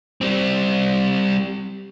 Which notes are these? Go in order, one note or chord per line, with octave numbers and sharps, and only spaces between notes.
G3 C4